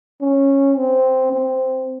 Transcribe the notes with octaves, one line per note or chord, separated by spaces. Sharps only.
C#4
C4
C4